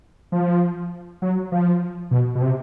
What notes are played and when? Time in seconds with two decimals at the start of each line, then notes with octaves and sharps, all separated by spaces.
0.32 F3
1.22 F#3
1.52 F3
2.11 B2
2.35 B2
2.41 C3